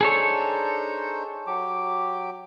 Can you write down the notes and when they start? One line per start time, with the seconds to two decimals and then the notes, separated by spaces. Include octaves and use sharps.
0.01 D4 D#4 G#4 A4 C5 C#5
1.47 F#3 G4 D6